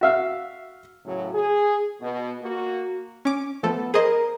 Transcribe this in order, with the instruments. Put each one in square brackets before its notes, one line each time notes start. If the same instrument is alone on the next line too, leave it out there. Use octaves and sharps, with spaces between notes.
[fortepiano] F#4 E5 F5
[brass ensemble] F#2 A2 C#3 F#3
G#4
B2
A#3 F#4
[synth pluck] C#4 D6
[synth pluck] F3 A3 A4 [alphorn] B3
[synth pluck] G#4 C5 D#5 [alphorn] A#4